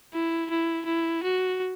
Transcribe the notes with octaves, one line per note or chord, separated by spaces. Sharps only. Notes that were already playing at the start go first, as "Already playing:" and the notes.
E4
E4
E4
F#4